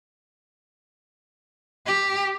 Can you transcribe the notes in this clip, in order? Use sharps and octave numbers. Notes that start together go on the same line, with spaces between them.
G4